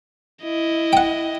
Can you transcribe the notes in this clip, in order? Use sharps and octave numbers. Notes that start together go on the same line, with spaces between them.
E4 D#5
F#5 G5